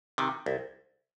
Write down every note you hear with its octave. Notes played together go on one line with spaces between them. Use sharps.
C3 D#3
C2